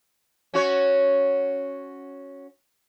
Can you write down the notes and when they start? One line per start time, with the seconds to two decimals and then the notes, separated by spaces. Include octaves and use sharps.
0.54 C#4 F#4 C#5